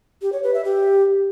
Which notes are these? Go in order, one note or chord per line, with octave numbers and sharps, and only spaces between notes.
G4
C#5
B4
E5
G4